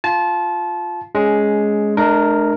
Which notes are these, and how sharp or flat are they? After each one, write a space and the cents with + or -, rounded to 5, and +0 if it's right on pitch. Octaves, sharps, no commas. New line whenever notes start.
F4 +5 A5 -25
G#3 +5 C#4 +15
A3 -40 D4 +30 A#4 +0